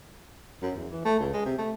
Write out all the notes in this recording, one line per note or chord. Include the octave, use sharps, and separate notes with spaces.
F#2
E2
E3
A3
C#2
G#3
C3
A3